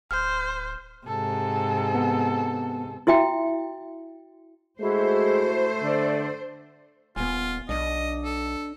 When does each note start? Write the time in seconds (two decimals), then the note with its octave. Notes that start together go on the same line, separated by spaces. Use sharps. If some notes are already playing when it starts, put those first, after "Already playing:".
0.11 D1 C5 F6 G6
1.07 G#2 C3 A4
1.95 B3
3.07 E4 F#4 E5 G5
4.80 G#3 A3 E4 F#4 C5
5.82 D3 A4 D5
7.16 D#1 B3 F4 G#5
7.69 B1 D4 D#5
8.24 A4